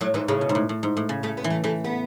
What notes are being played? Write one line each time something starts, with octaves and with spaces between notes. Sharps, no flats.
A2 F#3
G#2 E3
A2 C#3
B2
G#2
A2
A2
G#2
A2
C#3
C#3 A3
B3
E3
A3
E3 A3
B3